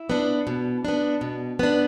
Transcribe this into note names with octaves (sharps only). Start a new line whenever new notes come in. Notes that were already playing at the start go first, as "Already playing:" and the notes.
Already playing: E4
B3 D4
B2
B3 D4
B2
B3 D4